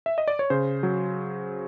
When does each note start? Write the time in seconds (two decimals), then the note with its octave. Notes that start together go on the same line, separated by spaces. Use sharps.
0.06 E5
0.18 D#5
0.28 D5
0.39 C#5
0.50 C#3 C5
0.83 F#3